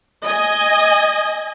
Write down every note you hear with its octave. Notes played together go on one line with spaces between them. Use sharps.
D#5 G#5